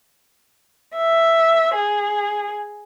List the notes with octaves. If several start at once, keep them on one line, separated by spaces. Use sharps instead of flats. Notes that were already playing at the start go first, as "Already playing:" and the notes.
E5
G#4